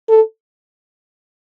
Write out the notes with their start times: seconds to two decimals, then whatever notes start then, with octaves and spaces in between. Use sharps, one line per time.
0.09 A4